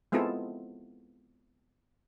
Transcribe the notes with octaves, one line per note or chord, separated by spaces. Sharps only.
G#3 B3 C4 E4 F4 A4